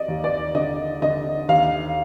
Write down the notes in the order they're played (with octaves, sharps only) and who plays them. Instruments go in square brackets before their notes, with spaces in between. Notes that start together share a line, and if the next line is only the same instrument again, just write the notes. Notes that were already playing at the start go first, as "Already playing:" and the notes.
Already playing: [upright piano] D5 D#5
D#2
D5
D3 D#5
D3 D#5
D#2 F5